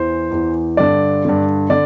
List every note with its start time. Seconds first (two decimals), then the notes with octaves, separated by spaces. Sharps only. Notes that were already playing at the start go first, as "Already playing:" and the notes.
Already playing: E2 E3 C5
0.31 E2 E3
0.77 G2 D3 D5
1.25 G2 D3
1.70 D3 D5